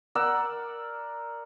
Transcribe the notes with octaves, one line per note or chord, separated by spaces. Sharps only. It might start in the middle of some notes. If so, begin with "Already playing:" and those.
A#4 D5 F#5 E6